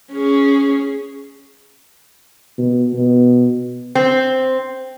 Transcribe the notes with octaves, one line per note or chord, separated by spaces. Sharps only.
C#4 G#4
B2
B2
C4